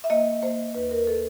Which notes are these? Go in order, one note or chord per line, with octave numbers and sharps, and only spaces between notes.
E5
A#3 D#5
A#3 C5
D#2 B4
A#4
A4